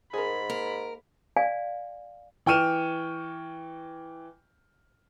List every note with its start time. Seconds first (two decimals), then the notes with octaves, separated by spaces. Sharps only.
0.13 G#2 G#4 A#4 B5
0.50 A#3 A#4
1.37 D5 F5 G#5
2.46 E3 G5 C#6 F6 D#7 E7